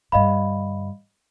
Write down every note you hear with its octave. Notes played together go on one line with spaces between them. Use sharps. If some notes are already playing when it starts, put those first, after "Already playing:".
G2 D3 D#5 F5 B5